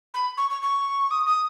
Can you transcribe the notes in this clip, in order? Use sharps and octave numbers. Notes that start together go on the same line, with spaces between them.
B5
C#6
C#6
C#6
D#6
D#6